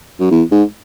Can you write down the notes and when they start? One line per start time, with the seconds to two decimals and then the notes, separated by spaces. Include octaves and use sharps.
0.20 F#2
0.31 E2
0.51 G#2